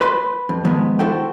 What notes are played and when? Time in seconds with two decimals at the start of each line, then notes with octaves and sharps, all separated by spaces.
0.01 B4 B5 C6
0.49 F2
0.65 G#2 D#3 F3 G#3 B3
0.99 E4 F#4 A4 C5 F#5 G5